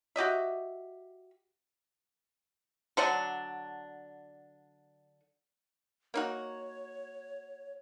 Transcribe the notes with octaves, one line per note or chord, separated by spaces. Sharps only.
F#4 G4 D#5 E5
D3 F#3 D4
A#3 D#4 F#4 C#5